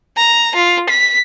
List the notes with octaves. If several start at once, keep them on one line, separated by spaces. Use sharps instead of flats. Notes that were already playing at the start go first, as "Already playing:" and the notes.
A#5
F4
B6